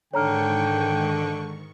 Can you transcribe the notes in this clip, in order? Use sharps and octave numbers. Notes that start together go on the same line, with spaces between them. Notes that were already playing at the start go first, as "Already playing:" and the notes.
G#2 D3 D#3 C#5 G5 A#5 C#6 F6